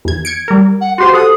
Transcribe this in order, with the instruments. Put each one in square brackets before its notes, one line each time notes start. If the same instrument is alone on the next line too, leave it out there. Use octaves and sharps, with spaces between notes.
[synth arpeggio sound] E2 G#6
G#6 C#7 D7
G3 A#4
[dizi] F#5
[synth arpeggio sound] F#4 G4 C5 [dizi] C6
[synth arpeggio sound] A4 F#5 [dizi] D#6